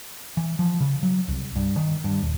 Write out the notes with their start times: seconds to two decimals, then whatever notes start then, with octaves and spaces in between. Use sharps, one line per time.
0.37 E3
0.59 F3
0.80 C#3
1.03 F#3
1.28 C2
1.56 G2
1.77 D#3
2.04 G2
2.22 D#1